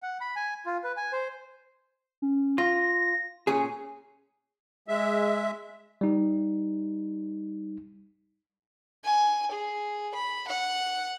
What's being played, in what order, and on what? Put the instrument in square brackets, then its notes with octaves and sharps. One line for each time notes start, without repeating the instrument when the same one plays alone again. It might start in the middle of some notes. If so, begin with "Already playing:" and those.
[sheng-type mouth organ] F#5
B5
G#5
F4
B4
G#5
C5
[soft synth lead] C#4
[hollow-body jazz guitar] F4 [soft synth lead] A#6
[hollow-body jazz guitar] A#2 C#4 G#4 [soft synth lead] G#5
[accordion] G#3 E5
[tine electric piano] G3 D#4
[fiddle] G#5
G#4
B5
F#5